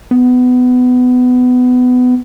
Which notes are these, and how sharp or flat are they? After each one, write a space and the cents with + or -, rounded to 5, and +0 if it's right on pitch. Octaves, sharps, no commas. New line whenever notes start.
B3 +20